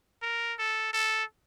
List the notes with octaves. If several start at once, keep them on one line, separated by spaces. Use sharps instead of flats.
A#4
A4
A4